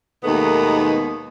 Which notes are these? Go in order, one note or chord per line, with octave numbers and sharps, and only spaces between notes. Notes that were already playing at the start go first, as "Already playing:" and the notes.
D#2 B2 D#3 G#3 A3 B3